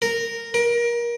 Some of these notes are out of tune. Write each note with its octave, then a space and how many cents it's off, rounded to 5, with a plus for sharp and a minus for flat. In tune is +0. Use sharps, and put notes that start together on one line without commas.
A#4 -10
A#4 +25